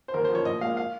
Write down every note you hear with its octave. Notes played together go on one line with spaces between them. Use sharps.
C5
D#2 A#4
C5
C#3 F3 C#5
A#1 D#5
A#2 G#3 F5
F5